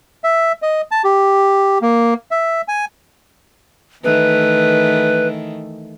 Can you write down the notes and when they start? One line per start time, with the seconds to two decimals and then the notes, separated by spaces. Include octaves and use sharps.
0.24 E5
0.62 D#5
0.91 A5
1.04 G4
1.82 A#3
2.31 E5
2.68 G#5
4.04 D#3 E3 A3 B4